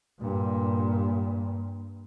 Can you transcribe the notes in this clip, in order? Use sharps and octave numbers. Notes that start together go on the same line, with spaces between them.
G2 A#2